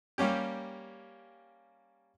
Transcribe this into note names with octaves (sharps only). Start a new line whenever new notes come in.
G3 A#3 C#4 G4